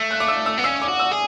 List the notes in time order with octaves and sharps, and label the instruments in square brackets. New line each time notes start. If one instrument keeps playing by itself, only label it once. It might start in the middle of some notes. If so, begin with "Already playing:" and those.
Already playing: [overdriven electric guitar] A3 [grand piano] E6
[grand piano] F#6
D6
E6
E6
[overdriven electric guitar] B3
[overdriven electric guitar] C#4 [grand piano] E6
[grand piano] D6
[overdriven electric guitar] F#4
[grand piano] E6
[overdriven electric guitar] G#4